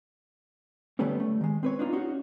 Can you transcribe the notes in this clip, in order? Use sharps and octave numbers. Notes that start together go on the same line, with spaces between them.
D3 F#3 G3 A3 B3 C#4
A3
D#3 G#3
C4 B4 C#5
D4 D#4 F4
C#4 D#4 F#4 G4